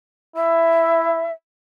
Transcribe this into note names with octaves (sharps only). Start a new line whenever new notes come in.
E4 E5